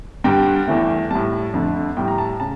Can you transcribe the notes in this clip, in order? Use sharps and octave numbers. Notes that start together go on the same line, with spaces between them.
G2 D3 G3 G5
E2 E3 A3
A2 G3 A5
F2 D3 A3
A2 G3 G5
A#5
A5
C#3 A5